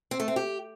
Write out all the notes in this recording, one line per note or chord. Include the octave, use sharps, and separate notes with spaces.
C4
A3
C4
G4